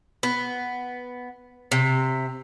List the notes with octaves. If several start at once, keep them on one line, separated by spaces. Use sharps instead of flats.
B3
C3